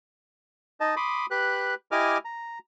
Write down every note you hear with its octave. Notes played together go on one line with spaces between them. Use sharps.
D#4 D#5 A5
B5 C6 D6 D#6
G4 B4 F#6
E4 G4 D#5 G#5 D6 F6
A#5